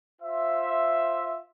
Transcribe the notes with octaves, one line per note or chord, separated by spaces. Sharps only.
F4 C5 E5